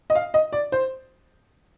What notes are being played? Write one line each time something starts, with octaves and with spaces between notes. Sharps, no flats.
D#5
F5
D#5
D5
C5